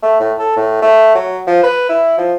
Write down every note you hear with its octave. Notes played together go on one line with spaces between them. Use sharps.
A3
A2
A4
A2
A3
F#3
F3
B4
E4
F3